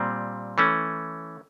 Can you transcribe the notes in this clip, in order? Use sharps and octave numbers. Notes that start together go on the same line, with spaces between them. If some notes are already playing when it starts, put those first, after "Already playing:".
Already playing: A#2 G3 C4
E3 A3 C#4